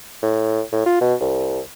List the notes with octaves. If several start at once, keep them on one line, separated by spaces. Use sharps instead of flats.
A2
A2
F4
B2
C2